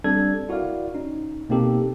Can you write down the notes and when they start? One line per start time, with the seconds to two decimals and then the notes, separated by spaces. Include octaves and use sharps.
0.04 G3 C4 D4 A4 D5 G#6
0.49 E4 F#4 A#4 D5 F5
0.94 C#4 D#4
1.49 B2 A#3 C4 D#4 G4 A4